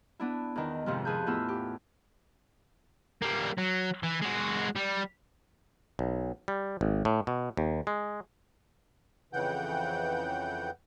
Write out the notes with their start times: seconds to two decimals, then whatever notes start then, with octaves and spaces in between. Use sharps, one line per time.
0.20 B3 D4 E4
0.56 E2 D#3
0.86 F2 G#2 C3 D#3 F3
1.05 F2 G#4 B4 A5 G6
1.26 E2 A2 B3 E4 F4 E6
1.49 G4
3.22 G3 A#3
3.58 F#3
4.03 E3
4.21 G#3 F#4
4.76 G3
5.99 B1
6.48 G3
6.81 G#1
7.05 A2
7.27 B2
7.57 D#2
7.87 G#3
9.33 F2 C#3 E3 F#5 G5 G6